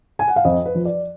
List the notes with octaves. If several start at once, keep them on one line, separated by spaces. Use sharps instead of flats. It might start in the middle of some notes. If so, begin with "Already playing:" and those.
G#5
F#5
F5
F2 D#5
B4
F3
D5